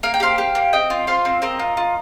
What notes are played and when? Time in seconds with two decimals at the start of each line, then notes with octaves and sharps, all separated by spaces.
0.03 A#3 F5
0.14 G5
0.20 G4 C5 F5
0.38 G4
0.55 A#3
0.73 C4 D#5 G5
0.90 F4
1.07 F4 C5 F5
1.25 C4
1.42 C4 A#4 D#5
1.59 F4
1.77 F4